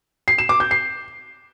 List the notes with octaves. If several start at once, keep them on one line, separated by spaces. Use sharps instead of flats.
C7
E7
D6
G6
C7